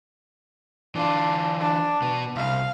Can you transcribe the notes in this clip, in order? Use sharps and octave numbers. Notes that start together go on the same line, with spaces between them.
E3 D4 F4
D4
B2 B3
C2 F5